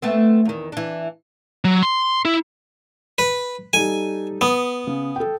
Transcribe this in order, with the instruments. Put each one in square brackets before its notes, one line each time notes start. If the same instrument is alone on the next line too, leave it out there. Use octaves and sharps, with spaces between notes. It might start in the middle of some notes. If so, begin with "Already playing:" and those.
[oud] A3 B3 C4
E2 D#3
E3 D4
[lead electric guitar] F#3
C6
E4
[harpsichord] B4
[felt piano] G3 D#4 A4 [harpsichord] G#5
[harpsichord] B3 [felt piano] D#6
[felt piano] C#3
A4 G5